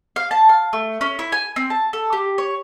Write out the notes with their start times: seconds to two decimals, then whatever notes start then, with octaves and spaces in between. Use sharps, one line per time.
0.16 F5
0.31 A5
0.49 F5
0.73 A3
1.01 C#4
1.19 E4
1.32 G#5
1.56 C4
1.70 A5
1.93 A4
2.13 G4
2.38 C#5